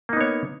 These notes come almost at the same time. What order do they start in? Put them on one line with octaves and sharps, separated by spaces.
A#3 D#4 B3 C#5